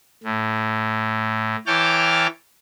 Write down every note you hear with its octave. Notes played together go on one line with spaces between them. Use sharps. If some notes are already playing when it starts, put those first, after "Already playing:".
A2
E3 C#5 G5 A5 D6 F6